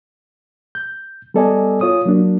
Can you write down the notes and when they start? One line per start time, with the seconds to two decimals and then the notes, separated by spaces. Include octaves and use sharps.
0.75 G6
1.34 G3 B3 A4 D5 D#5 G#5
1.81 F4 C#5 D#6
2.05 F#3 A#3 D4